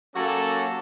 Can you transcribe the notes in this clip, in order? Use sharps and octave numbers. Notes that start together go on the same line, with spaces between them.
F#3 A#3 C#4 F#4 G4 A4